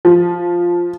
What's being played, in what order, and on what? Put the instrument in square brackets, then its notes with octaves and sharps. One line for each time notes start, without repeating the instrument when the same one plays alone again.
[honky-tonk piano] F3